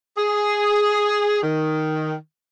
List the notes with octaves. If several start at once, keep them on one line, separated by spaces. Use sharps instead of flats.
G#4
D#3